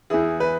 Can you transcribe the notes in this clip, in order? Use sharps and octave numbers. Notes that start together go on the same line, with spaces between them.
E2 E3 E4 G#4
B4